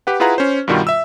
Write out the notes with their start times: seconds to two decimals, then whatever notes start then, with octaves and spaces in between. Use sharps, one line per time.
0.07 G4 B4 F#5
0.20 E4 F4 G#4 B4 F#5 A#5
0.38 C#4 C5
0.68 G2 B2 D#3 G3 F4 F#4
0.87 E5 E6